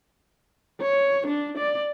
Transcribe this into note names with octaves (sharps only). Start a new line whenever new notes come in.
C#5
D4
D5